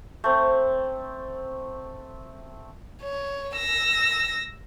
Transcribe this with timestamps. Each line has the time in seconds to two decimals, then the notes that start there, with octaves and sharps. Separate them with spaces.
0.24 A3 C4
3.02 C#5
3.57 E6 A#6